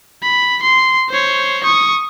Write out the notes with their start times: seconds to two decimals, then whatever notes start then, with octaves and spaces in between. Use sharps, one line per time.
0.23 B5
0.63 C6
1.10 C5 C#5
1.64 C#6 D#6